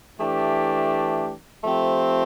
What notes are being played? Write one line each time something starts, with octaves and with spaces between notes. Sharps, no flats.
E3 A3 D4 G4
F3 A3 C4 G4